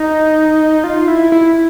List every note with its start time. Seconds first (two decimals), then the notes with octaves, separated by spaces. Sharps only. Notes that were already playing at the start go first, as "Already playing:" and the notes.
Already playing: D#4
0.84 F4
1.08 E4
1.32 E4